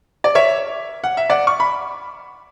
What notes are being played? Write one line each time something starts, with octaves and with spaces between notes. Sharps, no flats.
D5
C#5 E5
F#5
E5
D5 F#5
C#6
B5